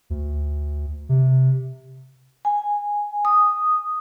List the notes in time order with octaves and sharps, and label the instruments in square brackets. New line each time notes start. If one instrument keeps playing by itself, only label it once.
[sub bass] D2
C3
[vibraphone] G#5
D#6